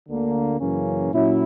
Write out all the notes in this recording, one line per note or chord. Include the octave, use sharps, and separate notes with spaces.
D2 D3 A#3
F#2 C#3 E3 A#3 C#4
A#2 F#3 C#4 E4